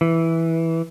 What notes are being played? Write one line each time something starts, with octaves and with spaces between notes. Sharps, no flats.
E3